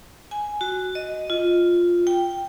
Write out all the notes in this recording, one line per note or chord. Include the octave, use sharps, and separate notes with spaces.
G#5
F#4
D#5
F4
G5